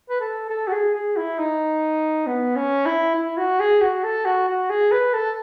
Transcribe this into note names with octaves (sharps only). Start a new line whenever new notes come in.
B4
A4
A4
F#4
G#4
G#4
E4
D#4
B3
C#4
E4
E4
F#4
G#4
F#4
A4
F#4
F#4
G#4
B4
A4